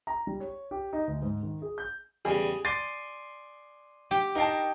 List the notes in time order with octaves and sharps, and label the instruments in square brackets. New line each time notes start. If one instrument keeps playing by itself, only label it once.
[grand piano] A#5
G3
C#5
G4
D#4
D2
G#2
D#3
G#4
G6
[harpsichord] E2 C#3 G3 [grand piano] G#4
[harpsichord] D5 G#5 C6 [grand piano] A6
[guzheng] G4 [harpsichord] G5
[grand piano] D#4 G5 A5 [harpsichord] A#4 F5